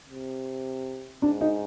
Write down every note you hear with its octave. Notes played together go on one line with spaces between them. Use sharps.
C3
G#2 D4
D#4